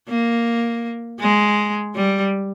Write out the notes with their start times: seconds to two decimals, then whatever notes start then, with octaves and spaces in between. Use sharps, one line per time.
0.08 A#3
1.20 G#3
1.95 G3